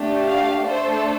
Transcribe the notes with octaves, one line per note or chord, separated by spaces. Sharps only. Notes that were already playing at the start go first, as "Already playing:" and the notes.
Already playing: A3 D4 G4
F5
A3 D4 A4 C5